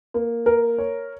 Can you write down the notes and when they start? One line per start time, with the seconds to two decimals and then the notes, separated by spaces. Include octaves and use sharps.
0.14 A#3
0.46 A#4
0.78 C#5